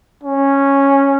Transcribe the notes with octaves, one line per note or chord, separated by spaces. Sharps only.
C#4